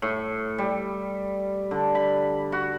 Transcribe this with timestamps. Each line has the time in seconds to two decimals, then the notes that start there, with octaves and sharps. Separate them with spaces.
0.02 A2
0.58 G3
1.71 D3
1.95 B5
2.52 F#4